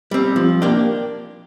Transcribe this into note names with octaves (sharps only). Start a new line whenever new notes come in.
G3 C4
F3
A#3 D4 G4